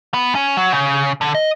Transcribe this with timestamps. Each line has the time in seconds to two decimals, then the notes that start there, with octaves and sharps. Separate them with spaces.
0.14 B3
0.35 C#4
0.57 F#3
0.72 C#3
1.21 D3
1.35 D#5